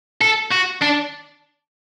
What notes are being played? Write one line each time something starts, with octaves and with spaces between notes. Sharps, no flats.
A4
F#4
D4